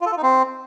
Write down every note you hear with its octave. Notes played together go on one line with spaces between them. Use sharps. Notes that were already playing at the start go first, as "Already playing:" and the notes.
F4
A4
F4
D#4
C4